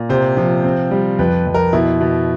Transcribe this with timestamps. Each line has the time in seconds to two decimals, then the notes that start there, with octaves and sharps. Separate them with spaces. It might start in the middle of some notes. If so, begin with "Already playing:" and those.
Already playing: A#2
0.09 C3 C5
0.37 F3
0.64 C4
0.91 G3
1.19 F2 B4
1.46 F2
1.54 A#4
1.73 B2 E4
2.01 B2